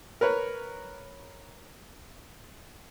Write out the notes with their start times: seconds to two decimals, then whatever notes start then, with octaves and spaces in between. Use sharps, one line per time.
0.21 A#4 B4 C#5